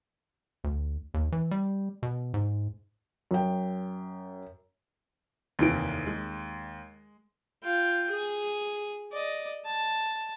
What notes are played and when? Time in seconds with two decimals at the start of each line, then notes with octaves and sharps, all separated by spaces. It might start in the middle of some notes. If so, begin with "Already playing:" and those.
0.64 D2
1.14 D#2
1.32 E3
1.51 G3
2.03 B2
2.34 G#2
3.31 F#2 G5
5.59 F1 D#2 E3 D7
6.06 G#3
7.63 F4 G5
8.11 G#4
9.12 D5 D#5
9.65 A5